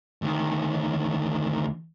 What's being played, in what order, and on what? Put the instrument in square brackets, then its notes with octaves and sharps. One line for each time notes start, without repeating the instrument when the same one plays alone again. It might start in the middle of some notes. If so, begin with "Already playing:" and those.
[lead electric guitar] D2 D#3